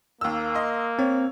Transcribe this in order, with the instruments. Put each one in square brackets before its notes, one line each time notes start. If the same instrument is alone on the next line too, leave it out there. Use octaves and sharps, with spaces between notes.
[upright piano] D#2 E6 [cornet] A#3
[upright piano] D#5 C6
[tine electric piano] C4 [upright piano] C#5